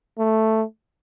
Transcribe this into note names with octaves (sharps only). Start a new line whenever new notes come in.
A3